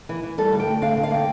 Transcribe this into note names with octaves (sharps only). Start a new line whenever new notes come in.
E3
E3
G3 A4
D2
G5
D2
D3 F5
D3
F5
A#3 G5